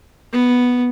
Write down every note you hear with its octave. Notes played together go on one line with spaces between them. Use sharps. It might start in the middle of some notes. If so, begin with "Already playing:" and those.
B3